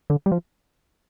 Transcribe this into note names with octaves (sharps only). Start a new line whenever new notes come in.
D3
G3
F3